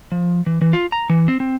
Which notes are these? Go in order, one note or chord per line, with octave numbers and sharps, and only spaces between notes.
F3
E3
E3
F4
A#5
E3
C4
C4